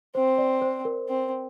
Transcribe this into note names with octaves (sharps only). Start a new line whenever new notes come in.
C4 C5
D5
C5
A#4
C4